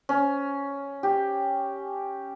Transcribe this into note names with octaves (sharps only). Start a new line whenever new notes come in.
C#4
G4